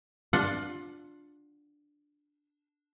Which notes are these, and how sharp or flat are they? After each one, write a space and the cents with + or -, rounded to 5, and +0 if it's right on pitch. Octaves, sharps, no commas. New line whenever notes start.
D4 +0 F4 +20 F#5 +0